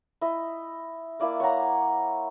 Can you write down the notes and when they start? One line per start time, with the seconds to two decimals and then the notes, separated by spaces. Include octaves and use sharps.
0.21 E4 D#5
1.19 A#3 E4 D5 F5
1.40 C#5 F#5 A#5